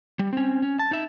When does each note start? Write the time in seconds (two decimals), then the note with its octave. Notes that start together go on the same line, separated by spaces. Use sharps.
0.19 G3
0.33 C4 C#4
0.62 C#4
0.79 A5
0.91 D#4 E5